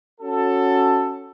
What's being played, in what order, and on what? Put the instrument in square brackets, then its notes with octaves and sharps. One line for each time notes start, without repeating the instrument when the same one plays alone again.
[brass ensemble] C#4 F#4 A4